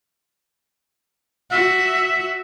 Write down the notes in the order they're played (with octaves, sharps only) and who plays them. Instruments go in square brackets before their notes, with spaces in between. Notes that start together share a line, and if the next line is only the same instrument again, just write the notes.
[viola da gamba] F#4 [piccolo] E5